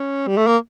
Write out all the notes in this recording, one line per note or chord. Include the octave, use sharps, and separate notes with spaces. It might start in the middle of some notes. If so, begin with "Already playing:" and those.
Already playing: C#4
G3
A3
A#3